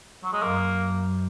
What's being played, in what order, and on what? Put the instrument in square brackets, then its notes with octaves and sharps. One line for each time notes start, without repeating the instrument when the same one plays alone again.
[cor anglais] F#3
G#3
[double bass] F#2 [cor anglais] A#3